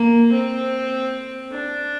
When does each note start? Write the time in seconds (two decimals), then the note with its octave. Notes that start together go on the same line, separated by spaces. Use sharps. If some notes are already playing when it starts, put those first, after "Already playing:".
Already playing: A#3
0.32 C4
1.52 D4